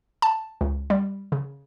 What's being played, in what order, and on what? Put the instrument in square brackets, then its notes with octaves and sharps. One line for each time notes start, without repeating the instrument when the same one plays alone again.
[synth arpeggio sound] A5
C#2
G3
C#3